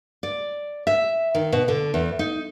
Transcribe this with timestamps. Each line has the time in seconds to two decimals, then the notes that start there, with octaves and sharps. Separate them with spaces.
0.23 D5
0.87 E5
1.35 D#3
1.52 B2
1.68 D3
1.94 E2
2.19 D#4